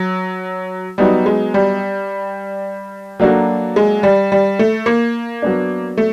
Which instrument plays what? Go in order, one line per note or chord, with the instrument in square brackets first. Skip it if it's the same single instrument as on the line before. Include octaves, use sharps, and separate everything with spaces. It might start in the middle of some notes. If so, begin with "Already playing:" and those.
Already playing: [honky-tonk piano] F#3
[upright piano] F#3 B3 D#4 [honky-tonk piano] G3
[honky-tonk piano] G#3
G3
[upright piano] F#3 A#3 D4 F#4 A4
[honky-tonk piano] G#3
G3
G3
A3
A#3
[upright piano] F#3 B3 D4
[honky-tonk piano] A3